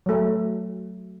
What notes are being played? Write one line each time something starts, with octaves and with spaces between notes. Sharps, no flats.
F#3 A3